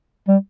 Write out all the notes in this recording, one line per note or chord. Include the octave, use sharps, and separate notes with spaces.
G3